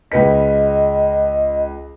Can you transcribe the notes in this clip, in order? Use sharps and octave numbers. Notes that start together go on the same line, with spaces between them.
C#2 B4 D#5 B6